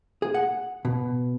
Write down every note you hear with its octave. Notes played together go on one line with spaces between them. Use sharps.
G#4
F#5
B2